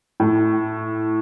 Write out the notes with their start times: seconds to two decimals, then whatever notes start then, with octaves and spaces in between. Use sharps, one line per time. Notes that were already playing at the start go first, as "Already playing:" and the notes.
0.20 A2